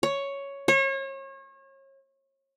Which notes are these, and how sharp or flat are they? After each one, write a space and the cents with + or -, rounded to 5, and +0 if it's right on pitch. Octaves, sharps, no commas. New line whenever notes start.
C#5 +5
C#5 -35